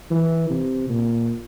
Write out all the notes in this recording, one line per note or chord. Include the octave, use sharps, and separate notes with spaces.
E3
C3
A#2